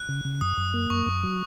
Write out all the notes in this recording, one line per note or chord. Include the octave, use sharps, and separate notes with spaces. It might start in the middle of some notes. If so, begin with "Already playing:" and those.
Already playing: F#6
C#3
C#3
F#2 D#6
F#2
A#3
F#2 C#6
F#2
F#3